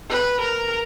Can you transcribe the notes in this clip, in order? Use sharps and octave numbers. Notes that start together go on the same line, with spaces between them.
B4
A#4